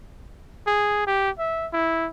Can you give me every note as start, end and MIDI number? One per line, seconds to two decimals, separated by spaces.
0.67 1.02 68
1.07 1.30 67
1.39 1.67 76
1.73 2.09 64